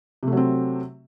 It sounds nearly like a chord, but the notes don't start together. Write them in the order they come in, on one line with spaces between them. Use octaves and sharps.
C3 A3 F#3 C4